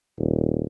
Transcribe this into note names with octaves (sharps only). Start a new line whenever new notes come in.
D#1